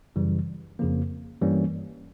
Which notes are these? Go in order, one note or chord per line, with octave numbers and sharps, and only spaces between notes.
F#2 C#3 E3 G3
F2 C#3 F3 A#3
G2 E3 G3 A#3 C#4